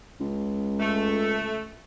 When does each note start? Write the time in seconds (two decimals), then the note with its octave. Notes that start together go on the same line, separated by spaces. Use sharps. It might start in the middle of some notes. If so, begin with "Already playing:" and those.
0.20 C#2
0.80 A3